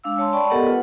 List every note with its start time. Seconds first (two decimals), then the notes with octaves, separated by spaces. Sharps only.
0.04 G#3 D4 F5 E6
0.17 G#3 C#5 A5 C6
0.33 D5 G5 A5 B5 C#6
0.50 B3 G4 A4 A#4 D#5 F#5
0.64 F4 B4